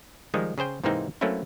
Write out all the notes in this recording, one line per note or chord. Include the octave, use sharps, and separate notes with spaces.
D#3 F3 G3 G#3 D#4
C#3 G#4 C5 G5
G#2 C3 E3 A#3 C4 D#4
F#3 A3 A#3 C4 C#4 E4